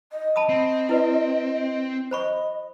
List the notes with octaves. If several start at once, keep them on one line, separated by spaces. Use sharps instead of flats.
D#5
A5 B5 D#6
C4
E4 B4 D5
C5 D#5 B5 C#6